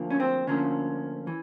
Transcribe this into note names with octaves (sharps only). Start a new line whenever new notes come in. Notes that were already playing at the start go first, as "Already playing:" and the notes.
Already playing: D2 D3 F3 A#3
C#4
C4
D2 D3 F3 A#3 C#4
E3